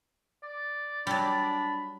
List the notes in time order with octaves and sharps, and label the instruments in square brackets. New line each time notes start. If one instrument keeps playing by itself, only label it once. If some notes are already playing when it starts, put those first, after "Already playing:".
[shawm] D5
[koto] F#3 G3 [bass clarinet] D4 [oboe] B5